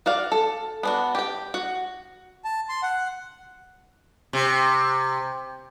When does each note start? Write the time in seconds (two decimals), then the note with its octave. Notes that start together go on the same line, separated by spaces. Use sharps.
0.06 F#4 D5 F5
0.32 A4
0.83 B3 D4 F#4
1.15 G4 G5
1.54 F#4
2.45 A5
2.69 C6
2.83 F#5
4.33 C3